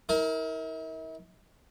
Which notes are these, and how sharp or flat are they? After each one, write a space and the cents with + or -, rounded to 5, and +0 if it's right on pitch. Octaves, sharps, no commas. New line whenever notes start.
E4 -45 A#4 +0